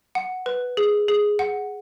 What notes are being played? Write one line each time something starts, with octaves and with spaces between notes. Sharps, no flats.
F#5
B4
G#4
G#4
F#5